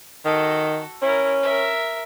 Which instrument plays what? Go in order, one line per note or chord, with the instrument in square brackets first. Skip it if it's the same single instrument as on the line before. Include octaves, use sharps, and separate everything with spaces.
[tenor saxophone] D#3 [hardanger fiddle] F#4 A4
[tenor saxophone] C#4 [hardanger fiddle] E4 A#4
[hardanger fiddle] A#4 E5